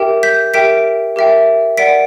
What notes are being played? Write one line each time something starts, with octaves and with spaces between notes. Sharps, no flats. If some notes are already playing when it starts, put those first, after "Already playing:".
Already playing: G4 A#4 E5 G5
G6 B6
G4 A#4 E5 G5 B6 D7
G4 A#4 E5 G5
A#4 D5 F#5 B6 D7